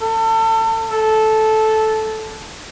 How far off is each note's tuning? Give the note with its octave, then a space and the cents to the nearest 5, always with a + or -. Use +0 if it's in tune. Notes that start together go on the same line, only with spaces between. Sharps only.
A4 +30
A4 -10